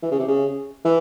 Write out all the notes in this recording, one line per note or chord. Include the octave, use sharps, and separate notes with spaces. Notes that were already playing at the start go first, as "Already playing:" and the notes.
E3
C#3
C3
C#3
E3